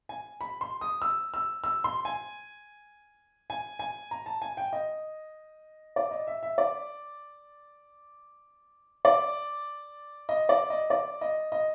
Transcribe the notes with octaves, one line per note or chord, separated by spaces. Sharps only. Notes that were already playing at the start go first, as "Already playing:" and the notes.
G#5
B5
C6
D#6
E6
E6
E6
C6
G#5
G#5
G#5
A#5
A5
G#5
G5
D#5
D5
D#5
E5
E5
D5
D5
D#5
D5
D#5
D5
D#5
D#5